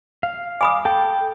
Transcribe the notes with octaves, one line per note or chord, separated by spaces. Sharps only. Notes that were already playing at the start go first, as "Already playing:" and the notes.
F5
G#5 B5 D6 D#6
A4 G5 A5